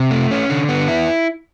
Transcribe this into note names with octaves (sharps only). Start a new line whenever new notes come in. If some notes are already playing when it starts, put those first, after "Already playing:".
Already playing: C3
A3
C#4
D3
B3
E4